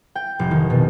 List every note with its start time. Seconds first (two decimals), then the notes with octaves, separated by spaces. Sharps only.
0.15 G5
0.39 F1
0.51 D#3
0.70 B2